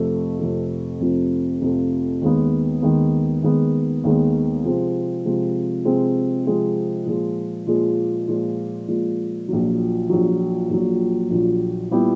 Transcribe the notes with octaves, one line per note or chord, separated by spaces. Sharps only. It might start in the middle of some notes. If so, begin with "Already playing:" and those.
Already playing: F2 C3 F3 A3
F2 C3 F3 A3
F2 C3 F3 A3
F2 C3 F3 A3
D#2 D#3 G#3 B3
D#2 D#3 G#3 B3
D#2 D#3 G#3 B3
D#2 D#3 G#3 B3
C3 F3 G#3 C4
C3 F3 G#3 C4
C3 F3 G#3 C4
C3 F3 G#3 C4
A#2 F3 G#3
A#2 F3 G#3
A#2 F3 G#3
A#2 F3 G#3
A#1 A#2 F#3
A#1 A#2 F#3
A#1 A#2 F#3
A#1 A#2 F#3
A#2 G3 B3 E4 G4